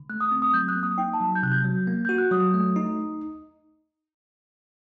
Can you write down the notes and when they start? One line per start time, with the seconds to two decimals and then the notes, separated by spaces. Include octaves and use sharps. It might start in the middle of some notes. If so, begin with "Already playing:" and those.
Already playing: D3
0.10 A3 F#6
0.21 D#6
0.31 C4
0.42 D#6
0.54 F#3 G6
0.68 F#6
0.76 A#3
0.83 D#6
0.98 D#4 G5
1.13 A5
1.21 F#3
1.35 G6
1.43 C3 F#6
1.52 G6
1.65 F#3
1.87 A#3
2.05 F#4 G6
2.18 F#6
2.31 F#3 D#6
2.54 A3
2.76 D#4